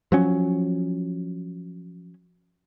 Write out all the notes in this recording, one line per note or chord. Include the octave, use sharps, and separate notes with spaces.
F3 F#3 C#4